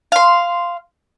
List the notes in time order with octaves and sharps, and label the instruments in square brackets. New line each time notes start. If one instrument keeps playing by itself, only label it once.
[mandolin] F5 C6